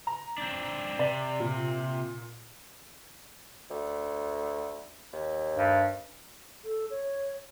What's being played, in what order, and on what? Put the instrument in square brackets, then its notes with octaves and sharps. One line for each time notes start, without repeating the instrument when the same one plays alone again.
[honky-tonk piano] A#5
[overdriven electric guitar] C4 D4
[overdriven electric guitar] C3 [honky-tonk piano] D5
[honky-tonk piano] A#2
[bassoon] D2
D#2
[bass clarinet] G2
[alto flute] A4
C#5